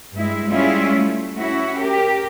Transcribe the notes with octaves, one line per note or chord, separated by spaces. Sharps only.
G2 G#3 E4
G3 G#3 C#4 E4 F4
A3
C#4 E4 F#4
G4 A#4